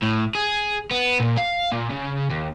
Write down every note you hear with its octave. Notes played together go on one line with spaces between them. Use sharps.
A2
G#4
B3
A#2
F5
A#2
C#3
D#2